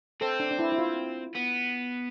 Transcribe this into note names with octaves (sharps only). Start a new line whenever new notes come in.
C4 A4
D4
D4
E4
E4
F4
B3